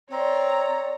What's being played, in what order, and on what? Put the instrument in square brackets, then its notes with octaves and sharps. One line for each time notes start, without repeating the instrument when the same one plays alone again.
[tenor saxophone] C4 [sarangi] C#5 [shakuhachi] D5 [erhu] A#5